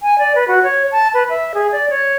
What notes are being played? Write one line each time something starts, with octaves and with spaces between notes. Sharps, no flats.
G#5
D5
B4
F#4
C#5
A5
B4
E5
G#4
D5
C#5